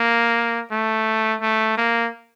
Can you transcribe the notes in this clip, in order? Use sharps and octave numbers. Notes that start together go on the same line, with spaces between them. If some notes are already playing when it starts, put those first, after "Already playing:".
Already playing: A#3
A3
A3
A#3